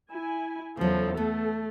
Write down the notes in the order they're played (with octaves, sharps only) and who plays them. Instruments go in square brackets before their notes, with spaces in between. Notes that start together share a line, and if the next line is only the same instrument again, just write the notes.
[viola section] E4 G#5
[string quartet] E2 F3 [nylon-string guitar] C#3 F#3 [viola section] A4
[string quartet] A3 [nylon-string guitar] B3